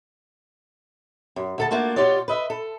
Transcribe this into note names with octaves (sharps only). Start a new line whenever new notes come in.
F#2
D2 A4 A5
A3 A#3 D4 F4 F#4
B2 F4 G4 C#5 D5
B4 D#5 E5
A4